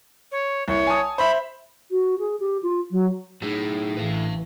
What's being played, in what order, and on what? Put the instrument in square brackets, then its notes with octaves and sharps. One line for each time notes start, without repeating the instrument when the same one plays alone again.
[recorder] C#5
[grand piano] C2 [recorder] C#5
[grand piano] G#5 A5 D#6
[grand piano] C5 E5 [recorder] B5
[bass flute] F#4
G#4
G4
F4
F#3
[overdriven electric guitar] A2 [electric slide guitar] F#3 D#4 [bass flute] G#4
[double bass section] A1 E3 [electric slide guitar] B4 F5